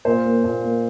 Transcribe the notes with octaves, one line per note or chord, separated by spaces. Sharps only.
A#2 C5
A#3
A#2
A#3